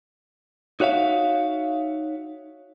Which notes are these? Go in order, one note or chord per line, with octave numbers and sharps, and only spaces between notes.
D#4 F#4 C#5 E5 F5